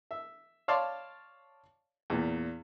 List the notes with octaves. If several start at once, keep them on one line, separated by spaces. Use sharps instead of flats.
E5
C#5 D5 F5 A5 C6 D6
E2 A#2